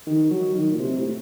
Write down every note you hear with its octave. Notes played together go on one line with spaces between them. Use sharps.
D#3
F#3
D#3
A#2
C3
A2